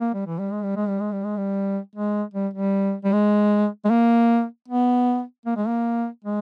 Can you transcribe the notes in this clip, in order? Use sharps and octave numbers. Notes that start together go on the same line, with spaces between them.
A#3
G3
E3
G3
G#3
G3
G#3
G3
G#3
G3
G#3
G3
G#3
G3
G3
G3
G#3
G#3
A#3
B3
A#3
G#3
A#3
G#3